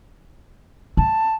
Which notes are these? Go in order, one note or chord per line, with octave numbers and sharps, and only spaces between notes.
C4 A5